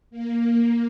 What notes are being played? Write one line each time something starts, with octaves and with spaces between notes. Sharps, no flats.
A#3